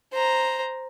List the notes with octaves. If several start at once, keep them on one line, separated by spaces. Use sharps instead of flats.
C5 A#5